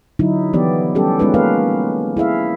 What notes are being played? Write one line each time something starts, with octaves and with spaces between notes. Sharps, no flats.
D3 F#3 D#4 E4
E3 F3 B3 G4 D5
G3 C#4 G4 A4
G#3 B3 C#4 D#4 F4 B4
A#3 A#4 B4 F5
E4 G#4 E5 F5